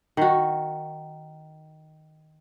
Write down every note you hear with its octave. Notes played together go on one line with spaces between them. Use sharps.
D#3 F#4